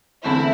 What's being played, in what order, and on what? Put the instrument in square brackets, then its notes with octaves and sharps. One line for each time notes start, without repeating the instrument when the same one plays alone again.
[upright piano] F#1 E2 D3 A3 C4 [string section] E4